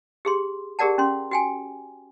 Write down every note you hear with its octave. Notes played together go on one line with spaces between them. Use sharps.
G4 G#4 C6
G4 G#4 A#4 D5 F#5 A5
C#4 C6
F#4 G5 G#5